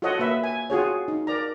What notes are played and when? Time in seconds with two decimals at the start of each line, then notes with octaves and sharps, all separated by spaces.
0.02 F4 F#4 A4 C#5 D#5 F#5
0.19 A#3 B4 E5
0.44 G#5
0.70 F4 F#4 G#4 C#5
1.08 D#4
1.27 A#4 D5 A#5